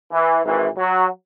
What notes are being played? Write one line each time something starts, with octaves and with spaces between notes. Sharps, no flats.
E3
G#1 G#2 E3
F#3